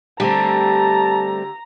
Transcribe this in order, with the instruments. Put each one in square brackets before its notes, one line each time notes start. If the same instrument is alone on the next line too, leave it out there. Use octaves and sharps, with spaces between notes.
[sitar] D3 G4 [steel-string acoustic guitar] G3 A3 C4 [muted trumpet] A5 [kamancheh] A#5